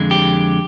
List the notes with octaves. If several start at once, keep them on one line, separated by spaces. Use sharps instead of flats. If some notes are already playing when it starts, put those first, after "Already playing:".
Already playing: F2 D3 G#3
G4